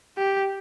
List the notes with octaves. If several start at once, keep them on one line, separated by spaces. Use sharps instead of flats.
G4